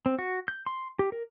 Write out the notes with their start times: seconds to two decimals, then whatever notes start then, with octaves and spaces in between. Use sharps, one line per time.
0.06 C4
0.19 F#4
0.48 G6
0.66 C6
0.99 G4
1.12 A#4